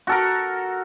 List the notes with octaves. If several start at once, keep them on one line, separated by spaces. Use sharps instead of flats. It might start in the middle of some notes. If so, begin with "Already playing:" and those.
F#4 A4 A#4